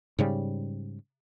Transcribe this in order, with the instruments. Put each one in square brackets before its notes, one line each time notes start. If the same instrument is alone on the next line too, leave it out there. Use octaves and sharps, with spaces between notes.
[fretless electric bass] G#2 C#3 G3